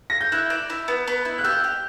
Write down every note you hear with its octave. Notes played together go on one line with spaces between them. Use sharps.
A#6
G6
E4 F#6
D5
E4
B3
B3
E4
F#6
G4 E6
G4